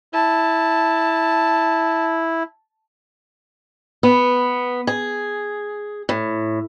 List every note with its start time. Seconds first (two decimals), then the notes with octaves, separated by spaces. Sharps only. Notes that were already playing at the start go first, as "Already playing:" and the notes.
0.14 E4 A5
4.03 B3
4.87 G#4
6.09 A2